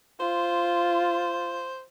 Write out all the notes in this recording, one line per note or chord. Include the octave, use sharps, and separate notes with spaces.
F4 C5